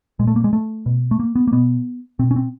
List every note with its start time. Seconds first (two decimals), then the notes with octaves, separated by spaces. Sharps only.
0.19 A#2 G#3
0.27 A3
0.36 A#3
0.44 G#3
0.53 A3
0.86 B2
1.11 A3
1.20 A#3
1.36 B3
1.48 A#3
1.52 B2 B3
2.19 B2 C4
2.31 C#4
2.36 C4